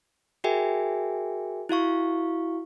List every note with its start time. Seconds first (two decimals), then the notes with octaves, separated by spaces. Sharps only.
0.44 F#4 G#4 A#4 E5 G5 G#5
1.69 E4 F#4 F5 C#6